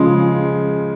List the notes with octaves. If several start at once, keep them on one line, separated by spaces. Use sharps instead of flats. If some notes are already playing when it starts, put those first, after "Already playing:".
Already playing: C#3 F3 G#3